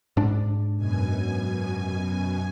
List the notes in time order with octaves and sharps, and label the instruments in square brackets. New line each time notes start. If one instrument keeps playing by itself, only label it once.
[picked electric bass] G#2 D4
[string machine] F#2 B2 G#5